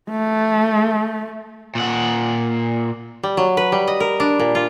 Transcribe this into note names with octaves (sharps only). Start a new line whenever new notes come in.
A3
A#2 F#5
G3
F#3
B4
G3
D#5
A#4
D4
A#2
F4